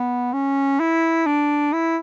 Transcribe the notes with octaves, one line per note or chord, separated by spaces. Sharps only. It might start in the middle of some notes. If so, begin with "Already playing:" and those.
Already playing: B3
C#4
E4
D4
E4